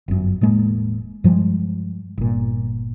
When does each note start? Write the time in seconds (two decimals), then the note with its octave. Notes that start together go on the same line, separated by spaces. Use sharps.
0.08 G1 F#2
0.41 E1 A2 G#3 A#3
1.24 G2 F3 G3 G#3
2.18 G1 A#2